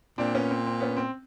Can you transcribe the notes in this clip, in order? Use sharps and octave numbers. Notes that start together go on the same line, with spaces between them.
A#2 C4 D4
B3 C#4
C4
C4
B3 C#4
C4